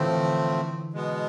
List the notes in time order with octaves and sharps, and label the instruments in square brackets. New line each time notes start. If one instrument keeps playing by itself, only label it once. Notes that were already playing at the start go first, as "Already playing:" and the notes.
Already playing: [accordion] A2 F3 A3 C4 [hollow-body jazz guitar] D3 E3
[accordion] B2 G#3 B3